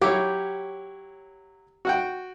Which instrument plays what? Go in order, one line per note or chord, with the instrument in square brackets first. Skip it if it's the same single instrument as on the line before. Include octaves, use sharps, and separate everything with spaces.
[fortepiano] F#3 E4 C#5 [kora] G4
[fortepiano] F#4 F#5 G5